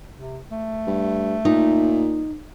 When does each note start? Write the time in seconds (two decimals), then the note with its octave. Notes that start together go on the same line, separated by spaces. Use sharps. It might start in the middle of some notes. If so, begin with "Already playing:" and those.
0.17 C3
0.51 A3
0.87 G2
1.45 A#2 D#4